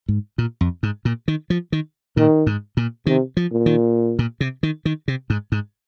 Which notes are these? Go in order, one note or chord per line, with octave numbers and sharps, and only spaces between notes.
G#2
A#2
F2
G#2
A#2
D#3
F3
D#3
A#2 D#3
G#2
A#2
C3 D#3
F3
A#2
D#3
A#2
C3
D#3
D#3
C3
G#2
G#2